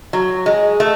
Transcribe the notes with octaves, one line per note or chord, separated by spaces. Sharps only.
F#3
G#3
A3